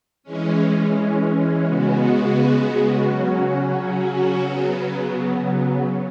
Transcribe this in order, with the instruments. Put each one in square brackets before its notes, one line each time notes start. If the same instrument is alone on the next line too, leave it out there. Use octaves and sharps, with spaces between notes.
[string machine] E3 G#3 C#4
C#3 G#3 B3 F#4
C#3 F#3 C#4 F#4
C#3 F#3 B3